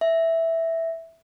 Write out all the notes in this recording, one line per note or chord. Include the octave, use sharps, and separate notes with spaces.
E5